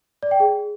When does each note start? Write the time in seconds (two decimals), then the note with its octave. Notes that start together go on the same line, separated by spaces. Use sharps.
0.23 D5
0.31 G5
0.40 G#4